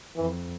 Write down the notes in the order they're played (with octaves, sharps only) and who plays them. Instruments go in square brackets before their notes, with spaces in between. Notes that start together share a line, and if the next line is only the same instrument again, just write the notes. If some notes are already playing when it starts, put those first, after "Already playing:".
[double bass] F2 [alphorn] E3